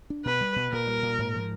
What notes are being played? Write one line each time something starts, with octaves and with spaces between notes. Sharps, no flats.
D4
B2 B4
G3
B2
A#2 A#4
G3
A#2
G#2
F3